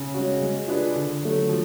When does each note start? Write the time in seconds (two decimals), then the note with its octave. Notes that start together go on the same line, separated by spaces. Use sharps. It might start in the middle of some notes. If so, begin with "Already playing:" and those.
Already playing: C#3
0.14 G#3 C#4 F#4
0.41 G#3
0.68 D4 F4 G#4 B4
0.96 D3
1.23 F#3 A3
1.49 F3